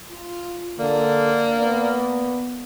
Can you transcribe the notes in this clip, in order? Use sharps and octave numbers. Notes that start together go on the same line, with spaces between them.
F4
D3 A#3 D5
B3